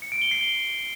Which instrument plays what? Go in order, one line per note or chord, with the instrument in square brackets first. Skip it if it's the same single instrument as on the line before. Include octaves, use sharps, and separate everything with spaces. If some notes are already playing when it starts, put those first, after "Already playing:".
[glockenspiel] C#7
D7
G7
C7
G7